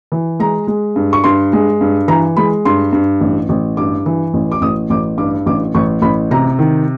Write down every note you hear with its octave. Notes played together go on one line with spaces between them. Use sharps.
E3
G#3 A#5
G#3
G2
C#6
G2 C6
G#3
G2
E3 A#5
G#3 B5
G2 C6
G2
A1
A1
G2 D6
E3
A1
D6
A1 D#6
A1 D6
G2 D6
A1 D6
A1 C#6
A1 B5
C3 A#5
D#3